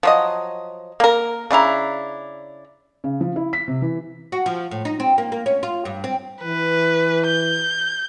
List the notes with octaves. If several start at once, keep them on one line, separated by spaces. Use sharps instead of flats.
F3 F#3 D#5
A#3 A#4
C#3 D4 E4 A#5
C#3
F3
E4
B6
C3
E3
F#4
F3
A2
D#4
C4
A#3
A#3
C#4
F4
G2
C4
E3 B4
G6